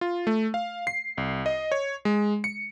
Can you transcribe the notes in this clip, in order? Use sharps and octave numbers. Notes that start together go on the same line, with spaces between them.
F4
A3
F5
C7
C2
D#5
C#5
G#3
C#7